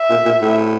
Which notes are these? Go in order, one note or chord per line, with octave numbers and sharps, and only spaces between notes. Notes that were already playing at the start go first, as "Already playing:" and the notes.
Already playing: E5
A#2
A#2
A2